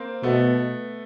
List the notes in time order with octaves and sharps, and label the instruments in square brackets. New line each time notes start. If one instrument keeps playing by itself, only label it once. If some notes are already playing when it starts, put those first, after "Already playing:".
Already playing: [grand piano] A#3 C4
[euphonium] B2 [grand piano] A3 B3